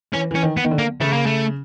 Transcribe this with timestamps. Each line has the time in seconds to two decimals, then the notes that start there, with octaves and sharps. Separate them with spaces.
0.14 E3 C#4
0.31 E3 C#4
0.43 D#3
0.57 B3
0.65 D#3
0.71 D3
0.78 A#3
1.01 C#3 A3
1.13 A#3
1.27 A3